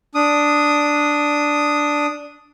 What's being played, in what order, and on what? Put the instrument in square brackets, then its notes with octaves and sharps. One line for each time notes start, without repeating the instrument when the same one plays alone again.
[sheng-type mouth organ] D4 D#6